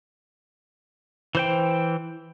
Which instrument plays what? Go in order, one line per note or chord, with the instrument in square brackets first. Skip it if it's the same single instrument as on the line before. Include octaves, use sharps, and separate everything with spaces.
[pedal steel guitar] E3 C5 G5